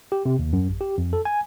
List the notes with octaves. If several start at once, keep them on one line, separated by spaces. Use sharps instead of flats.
G4
C3
D#2
F#2
A1
G4
F2
A4
G#5